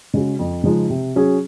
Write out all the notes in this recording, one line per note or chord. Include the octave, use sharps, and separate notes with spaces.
C#3 G#3 C#4 F#4
F2
C#3 F3 G#3 D#4
C3
F#3 C#4 G#4